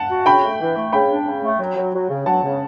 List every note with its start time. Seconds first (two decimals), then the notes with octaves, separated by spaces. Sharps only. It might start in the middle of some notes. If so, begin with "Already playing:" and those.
Already playing: F#5 A5
0.10 F#4
0.26 C#3 G5 B5
0.42 A3
0.60 E3
0.77 A3
0.93 C#3 G5 B5
1.09 D4
1.26 C#3
1.42 A3
1.59 F#3
1.76 F#3
1.93 F#3
2.09 C#3
2.26 F#3 F#5 A5
2.43 C#3